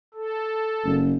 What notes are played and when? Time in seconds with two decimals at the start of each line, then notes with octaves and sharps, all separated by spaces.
0.14 A4
0.85 F#1